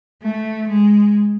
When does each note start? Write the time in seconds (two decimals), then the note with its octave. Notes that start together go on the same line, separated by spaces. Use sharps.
0.22 A3
0.69 G#3